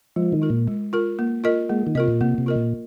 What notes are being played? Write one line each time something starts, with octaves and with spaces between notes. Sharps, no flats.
F3 G#3
D#3
F4 A#4
A#2
G#3
F4 A#4
A#3
F4 A#4 D#5
G#3 A#3
D#3
C3 F4 A#4 D#5
A#2
C3 A#3
C3
F4 A#4 D#5
A#2